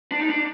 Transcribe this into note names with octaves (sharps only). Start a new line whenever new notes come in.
D4
D#4
D4